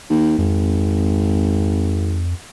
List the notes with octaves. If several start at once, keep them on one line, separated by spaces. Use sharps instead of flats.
D#2
G#1 F2